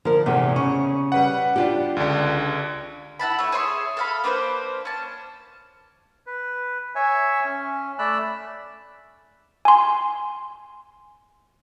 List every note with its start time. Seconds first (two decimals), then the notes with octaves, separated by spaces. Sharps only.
0.05 D3 F3 A#4
0.26 E2 G#2 C3
0.56 C#3 C#6
1.12 G3 B4 F#5
1.56 D4 F4 G4
1.97 C#2 D3
3.19 E4 F#5 A5 B5
3.39 A3 C#5
3.52 G#4 C#5 E5 C6
3.97 A4 F5 B5
4.24 A#3 D4 B4 C5
4.85 C#4 A5
6.27 B4
6.95 C#5 E5 G#5
7.45 C#4
7.99 A3 D5 B5 E6 F#6
9.65 G#5 C6